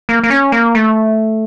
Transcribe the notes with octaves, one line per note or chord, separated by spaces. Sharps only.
A#3
A#3
C#4
A#3
A3